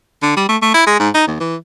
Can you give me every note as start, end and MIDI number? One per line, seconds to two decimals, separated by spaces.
0.22 0.32 50
0.37 0.46 55
0.49 0.57 57
0.62 0.74 57
0.74 0.85 64
0.87 0.95 56
0.99 1.09 44
1.15 1.26 63
1.27 1.36 39
1.40 1.56 52